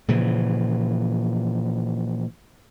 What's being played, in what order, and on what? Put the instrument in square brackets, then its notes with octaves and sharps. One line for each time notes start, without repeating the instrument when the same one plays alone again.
[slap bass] A#2 C#3 E3 F3